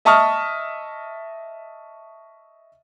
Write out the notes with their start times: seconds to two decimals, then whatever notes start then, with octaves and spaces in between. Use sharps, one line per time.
0.05 D#5 E5 A5 C#6 D#6 F6